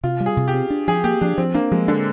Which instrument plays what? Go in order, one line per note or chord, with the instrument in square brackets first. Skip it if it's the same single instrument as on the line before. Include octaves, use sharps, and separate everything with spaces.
[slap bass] C3 [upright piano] F4
[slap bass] G3
[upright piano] G#4
[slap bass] C3
[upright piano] G4
[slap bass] C4
D4
[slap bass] F3 [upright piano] G#4
[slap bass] A#3 [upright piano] G4
[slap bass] F3 [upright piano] D4
[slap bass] F3 [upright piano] C4
[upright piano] A#3 [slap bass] D4
[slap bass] F3 [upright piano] G#3
[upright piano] D3 [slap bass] D4